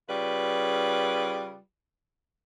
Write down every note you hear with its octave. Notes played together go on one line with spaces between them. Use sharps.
C#3 G3 F4 B4